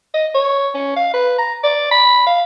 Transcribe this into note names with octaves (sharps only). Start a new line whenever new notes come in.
D#5
C#5
C#4
F5
B4
A#5
D5
B5
F5